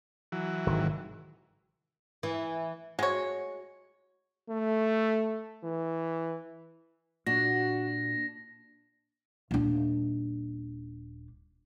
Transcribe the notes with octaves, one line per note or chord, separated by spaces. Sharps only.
E3 F#3
G#1 C3 D#3
E3
G#3 F#4 C#5
A3
E3
A#2 D4 F#4 A#6
D#1 D4